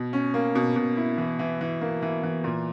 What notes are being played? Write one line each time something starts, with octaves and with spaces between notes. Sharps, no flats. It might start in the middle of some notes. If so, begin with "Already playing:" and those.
Already playing: B2
C#4
A#3
B2
B2
E4
E3
E3
E3
A#3
E3
E3
A#2